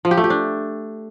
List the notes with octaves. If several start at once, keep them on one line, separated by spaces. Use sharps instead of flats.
F3
G4
A3
G4
D4